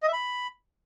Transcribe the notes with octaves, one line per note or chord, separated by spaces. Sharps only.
D#5
E5
B5